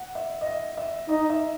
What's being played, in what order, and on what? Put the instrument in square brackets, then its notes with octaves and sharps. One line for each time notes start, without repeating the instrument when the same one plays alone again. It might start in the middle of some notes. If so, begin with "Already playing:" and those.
Already playing: [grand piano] F#5
E5
D#5
E5
E5
[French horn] D#4 [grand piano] D#5
[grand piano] E5